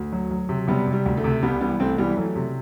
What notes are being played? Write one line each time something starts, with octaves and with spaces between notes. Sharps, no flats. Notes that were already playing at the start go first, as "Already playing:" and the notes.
Already playing: D2
F#3
F#3
C3
C3 G3 B3
C3
G3
D2
A3
C3
C2 G3 B3
E3 G3 B3
C2 A3 C4
E3 G3 B3
F#3 A3
C3